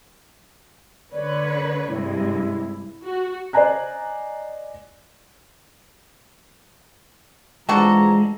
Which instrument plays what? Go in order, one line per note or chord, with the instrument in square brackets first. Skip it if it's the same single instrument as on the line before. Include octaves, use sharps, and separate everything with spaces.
[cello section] D3 B4 C#5 [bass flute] D5
[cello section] G2 C3 G#3 [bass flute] E4
[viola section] F#4
[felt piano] C5 D5 D#5 G#5 A#5 F#6
[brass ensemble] E2 F3 A#5 [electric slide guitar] G#3 [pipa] D4 F#4 A4